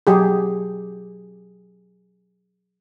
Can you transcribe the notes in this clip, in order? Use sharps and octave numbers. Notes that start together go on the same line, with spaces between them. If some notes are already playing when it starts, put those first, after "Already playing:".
F#3 G4 G#4